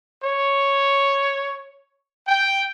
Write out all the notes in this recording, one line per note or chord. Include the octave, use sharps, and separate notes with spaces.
C#5
G5